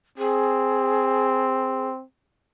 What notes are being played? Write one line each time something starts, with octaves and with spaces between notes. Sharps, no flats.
C4 G#4